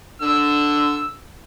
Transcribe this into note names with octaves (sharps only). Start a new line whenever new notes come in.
D3 E6